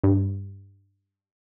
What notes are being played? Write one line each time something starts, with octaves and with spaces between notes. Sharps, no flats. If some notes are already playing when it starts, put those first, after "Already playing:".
G2